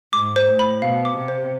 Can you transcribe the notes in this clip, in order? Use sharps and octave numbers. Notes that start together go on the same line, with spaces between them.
G#2 D6
C5
A2
B5
B2 F5
D6
C3
C5